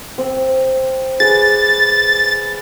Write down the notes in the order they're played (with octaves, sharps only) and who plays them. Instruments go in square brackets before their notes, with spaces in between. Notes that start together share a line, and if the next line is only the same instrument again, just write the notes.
[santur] C4
[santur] G#4 B4 D5 [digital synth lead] A6